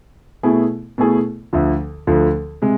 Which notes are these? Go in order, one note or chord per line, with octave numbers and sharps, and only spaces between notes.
B2 A3 E4 G#4
B2 A3 E4 G#4
D2 D3 F3
D2 D3 F3
C3 G#3